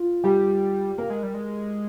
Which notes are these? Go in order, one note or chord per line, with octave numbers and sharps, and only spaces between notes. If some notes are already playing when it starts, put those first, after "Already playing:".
Already playing: F4
G3 G4
A#3 A#4
G#3
G3
G#3